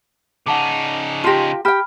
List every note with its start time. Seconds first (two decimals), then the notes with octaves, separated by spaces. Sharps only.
0.46 C#3 D#4 F#5 A5 D6
1.24 F4 G4 A5 C6 A#6
1.65 G4 G5 B5 F6